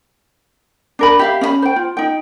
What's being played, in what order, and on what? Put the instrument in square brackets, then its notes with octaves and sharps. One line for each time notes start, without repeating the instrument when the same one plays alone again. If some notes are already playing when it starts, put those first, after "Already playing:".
[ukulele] D4 A#4 B5
G4 E5 F5
C#4 D#5 B5
C5 G5
F4
D#4 G5